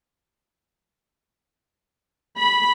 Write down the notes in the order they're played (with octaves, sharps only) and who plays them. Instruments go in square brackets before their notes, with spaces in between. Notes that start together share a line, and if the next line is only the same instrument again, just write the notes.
[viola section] B5